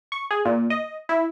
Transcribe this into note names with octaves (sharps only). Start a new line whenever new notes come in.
C#6
G#4
A#2
D#5
E4